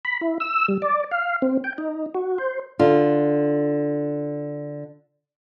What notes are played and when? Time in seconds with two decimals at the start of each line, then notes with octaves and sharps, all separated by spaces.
0.05 B5
0.21 E4
0.40 E6
0.68 G3
0.82 D5
1.11 F5
1.42 C4
1.64 G5
1.78 D#4
2.15 F#4
2.38 C5
2.79 D3 F4